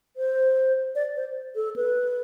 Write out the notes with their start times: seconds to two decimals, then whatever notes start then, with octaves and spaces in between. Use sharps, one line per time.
0.17 C5
0.95 D5
1.16 C5
1.56 A4
1.76 B4